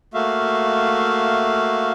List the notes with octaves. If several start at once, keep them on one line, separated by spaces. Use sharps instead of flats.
A3 A#3 F#4 E5 F5